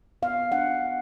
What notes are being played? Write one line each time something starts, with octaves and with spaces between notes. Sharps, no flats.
B3 F5
D4 F#5